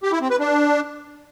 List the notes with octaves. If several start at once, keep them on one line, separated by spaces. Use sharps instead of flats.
G4
E4
C4
B4
D4